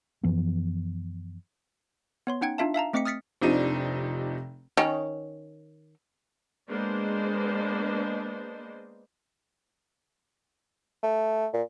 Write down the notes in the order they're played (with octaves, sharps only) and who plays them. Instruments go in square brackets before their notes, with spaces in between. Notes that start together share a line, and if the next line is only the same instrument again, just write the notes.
[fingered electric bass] F#2 E3 F3 B3
[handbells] B3 C#5 C6
C#4 D#4 F#5 G5 G#6
D4 D#4 F4 E5 F5 A5
E5 F5 A5 A#5
A3 C4 D#5 D6 B6 C#7
D#6 F6 A6 B6 C#7
[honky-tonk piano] F1 C3 F3 D4 D#4 D#7
[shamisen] D#3 C#4
[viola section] G#3 A#3 B3 D4 C5 D#5
[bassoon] A3
A#2